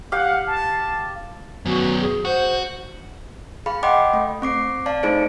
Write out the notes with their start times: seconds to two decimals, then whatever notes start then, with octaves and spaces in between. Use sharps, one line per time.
0.12 G4 F5 F#5
0.48 A5
1.65 F#2 B3 F#4
2.00 G#4
2.25 F#4 C5
3.66 G#4 F5 B5
3.83 D#5 F#5 G5 B5 C6 D6
4.13 A3
4.42 C4 D6 C7
4.86 D5 F5 A5
5.03 A3 D#4 G#4 C5 D7